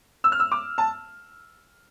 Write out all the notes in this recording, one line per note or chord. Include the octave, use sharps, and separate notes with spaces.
E6
F6
E6
D6
A5